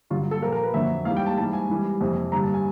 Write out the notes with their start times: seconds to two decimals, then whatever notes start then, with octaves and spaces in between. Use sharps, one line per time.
0.10 G2 D3 F#3 F4
0.31 A4
0.42 A#2 F3 A#4
0.52 A#4
0.63 B4
0.74 F2 D3 F#3 E5
1.05 G#2 E3 G3 F5
1.17 G5
1.26 A5
1.37 G#2 E3 G3 A5
1.53 G#5
1.69 G#2 E3 G3
2.01 F2 C3 E3
2.32 G2 D3 G3 A#5
2.43 A5
2.54 G#5